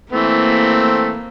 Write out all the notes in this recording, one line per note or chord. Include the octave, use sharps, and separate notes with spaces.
E3 A3 A#3 C4